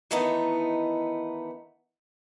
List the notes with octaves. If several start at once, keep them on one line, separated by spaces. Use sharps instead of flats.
D#3 E3 A3 B3 D#4